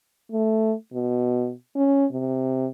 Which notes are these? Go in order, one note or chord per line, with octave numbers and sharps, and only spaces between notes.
A3
B2
C#4
C3